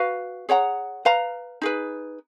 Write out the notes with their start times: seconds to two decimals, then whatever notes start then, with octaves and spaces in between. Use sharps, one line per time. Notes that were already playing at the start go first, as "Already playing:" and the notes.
Already playing: F#4 B4 F5
0.49 G#4 C#5 F#5 A#5
1.05 B4 F5 A#5
1.62 D#4 G#4 B4